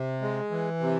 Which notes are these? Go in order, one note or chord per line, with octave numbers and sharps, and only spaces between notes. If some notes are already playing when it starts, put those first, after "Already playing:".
Already playing: C3
G#3
E3
C3